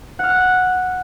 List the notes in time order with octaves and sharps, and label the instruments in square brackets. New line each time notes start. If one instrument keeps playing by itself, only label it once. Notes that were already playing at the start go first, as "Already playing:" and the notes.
[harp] F#5 F6